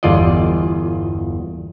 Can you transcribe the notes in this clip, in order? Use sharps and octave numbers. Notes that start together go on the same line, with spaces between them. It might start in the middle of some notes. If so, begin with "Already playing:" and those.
G1 E2 F4 D5 D#5